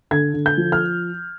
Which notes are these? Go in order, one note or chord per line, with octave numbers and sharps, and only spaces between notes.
D3 G#6
D3
G6
F3
F6